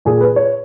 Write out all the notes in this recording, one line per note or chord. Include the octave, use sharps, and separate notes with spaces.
A#2 G#4
B4
C#5